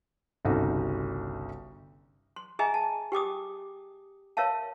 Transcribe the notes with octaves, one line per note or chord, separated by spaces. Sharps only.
G1 C2 C#3 D#4 F#4
C6
G#4 D#5 E5 G#5 A#5
A5
G4 G5 D6 D#6
A#4 C#5 E5 F5 A5